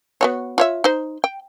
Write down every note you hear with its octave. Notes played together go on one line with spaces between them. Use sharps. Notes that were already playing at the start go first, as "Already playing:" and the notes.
B3 F#4 C#5
F4 C#5 E5
D#4 C5
G5